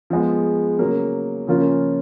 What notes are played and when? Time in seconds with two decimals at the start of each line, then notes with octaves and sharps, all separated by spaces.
0.10 F3 G#3 B3
0.79 C#3 F#3 A#3
1.47 C#3 F3 A#3 C#4 F4